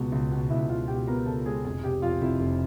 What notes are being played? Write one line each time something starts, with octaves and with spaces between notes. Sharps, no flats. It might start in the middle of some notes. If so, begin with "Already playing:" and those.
Already playing: C#2 B2 G#3 B3
C#2
B2
C#2 E4 E5
C#2 F4 F5
B2 G4 G5
B3 A#4 A#5
C#2 A4 A5
G#3 G#4 G#5
F1 G#4 G#5
C3 G4 G5
F2 F4 F5
F1 E4 E5
F1